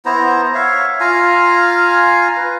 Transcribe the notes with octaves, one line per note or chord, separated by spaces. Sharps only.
B3 E4 C5 A#5
C#5 E5 F5
F4 F5 G#5 A#5
B4